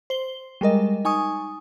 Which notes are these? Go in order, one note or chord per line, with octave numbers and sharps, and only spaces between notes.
C5 G7
G3 G#3 A#4 D#5
D#4 G#5 C#6 D#6